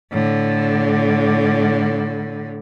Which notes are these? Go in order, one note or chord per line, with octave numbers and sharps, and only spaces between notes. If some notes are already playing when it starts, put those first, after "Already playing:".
A2 D3